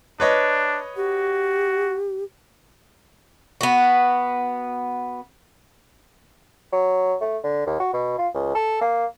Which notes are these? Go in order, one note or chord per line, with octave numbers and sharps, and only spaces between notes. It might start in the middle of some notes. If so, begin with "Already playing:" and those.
D4 B4 C#5 D#5
F#4 G4
B3 F#4
F#3
A3
D3
D#2
F#4
B2
F4
C#2
A4
A#3